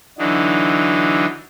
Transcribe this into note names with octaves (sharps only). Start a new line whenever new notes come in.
D3 E3 F#3 D4 D#4